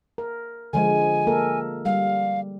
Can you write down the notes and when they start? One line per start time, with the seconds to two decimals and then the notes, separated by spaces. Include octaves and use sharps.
0.18 A#4
0.73 D3 F3 G#3 G#5
1.27 A#3 A4 A#4
1.85 G3 F5